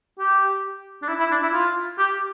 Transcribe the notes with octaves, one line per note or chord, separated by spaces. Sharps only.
G4
D4
E4
E4
D4
E4
F4
G4